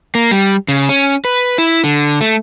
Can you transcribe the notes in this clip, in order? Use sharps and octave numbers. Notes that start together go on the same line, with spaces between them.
A#3
G3
C#3
C#4
B4
E4
D3
A3